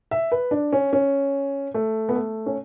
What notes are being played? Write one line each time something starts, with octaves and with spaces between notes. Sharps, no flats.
E5
B4
D4
C#4
C#4
A3
B3
A3
C#4